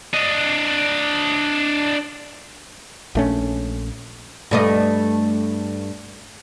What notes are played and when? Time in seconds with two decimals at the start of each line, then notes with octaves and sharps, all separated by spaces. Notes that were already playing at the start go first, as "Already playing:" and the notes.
0.13 D4 D#5
3.15 A#1 A3 C#4
4.51 G2 A3 D#5